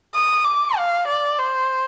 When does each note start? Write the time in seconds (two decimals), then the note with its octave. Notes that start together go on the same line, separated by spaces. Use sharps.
0.14 D#6
0.45 D6
0.77 F5
1.07 D5
1.38 C5